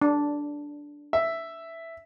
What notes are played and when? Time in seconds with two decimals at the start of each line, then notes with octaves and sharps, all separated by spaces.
0.02 D4
1.13 E5